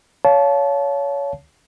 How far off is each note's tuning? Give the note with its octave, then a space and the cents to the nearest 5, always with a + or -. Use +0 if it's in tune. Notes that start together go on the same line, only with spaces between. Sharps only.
C#5 +25 F5 +0 A5 -20